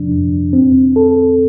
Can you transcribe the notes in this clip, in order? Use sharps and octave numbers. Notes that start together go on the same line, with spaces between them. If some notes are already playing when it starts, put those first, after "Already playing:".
Already playing: C3 F3 D4
F2
C4
A4